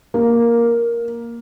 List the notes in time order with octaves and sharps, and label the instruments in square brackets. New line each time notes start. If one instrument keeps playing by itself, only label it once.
[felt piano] A#3